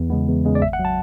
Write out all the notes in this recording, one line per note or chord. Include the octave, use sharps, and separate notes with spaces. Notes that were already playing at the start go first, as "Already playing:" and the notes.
Already playing: E2
C#3 G#3 B3
E2
C#3 G#3 B3
D5
G#1 E5
F#5
F#3
A5